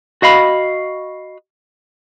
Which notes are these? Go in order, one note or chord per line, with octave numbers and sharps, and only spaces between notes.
F#4 D#5 F5 B5